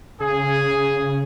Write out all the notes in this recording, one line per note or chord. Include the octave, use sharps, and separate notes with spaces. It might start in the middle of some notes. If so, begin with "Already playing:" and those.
C#3 G#4